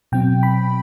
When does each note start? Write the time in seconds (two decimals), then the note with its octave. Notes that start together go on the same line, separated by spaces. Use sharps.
0.12 B2 F#3 C4 G5
0.43 B5